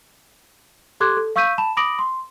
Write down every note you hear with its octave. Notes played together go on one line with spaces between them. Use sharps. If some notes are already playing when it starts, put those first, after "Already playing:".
G4 A4 C6 D6 F#6 G#6
A4
F5 C#6 E6 G6 B6 D#7
A5 B5 E7
B5 D6 D#6 A#6 D7 F#7
C6